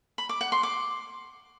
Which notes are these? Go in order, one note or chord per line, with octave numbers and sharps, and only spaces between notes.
B5
D6
F#5
C6
D6